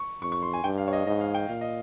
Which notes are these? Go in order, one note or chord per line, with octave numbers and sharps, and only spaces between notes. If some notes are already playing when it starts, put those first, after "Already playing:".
Already playing: C#6
F2 C#6
C#6
C6
G#5
G2 G5
F5
C#5
D#5
G#2 D#5
F5
G5
A#2 F5
D#5